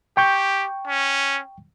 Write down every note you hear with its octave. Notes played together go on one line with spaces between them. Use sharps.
G4 G5 C#6 G6
C#4